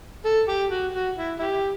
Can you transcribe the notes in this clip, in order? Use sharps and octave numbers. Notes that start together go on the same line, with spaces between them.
A4
G4
F#4
F#4
E4
E4 G4